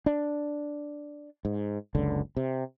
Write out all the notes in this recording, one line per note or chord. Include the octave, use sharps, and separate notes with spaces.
D4
G#2
F#1 C#2 D3
C3